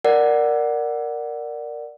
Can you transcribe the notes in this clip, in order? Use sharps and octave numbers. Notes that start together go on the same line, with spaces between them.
A#4 D5 F#5